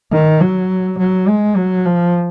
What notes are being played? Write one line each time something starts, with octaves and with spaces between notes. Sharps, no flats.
D#3
F#3
F#3
G#3
F#3
F3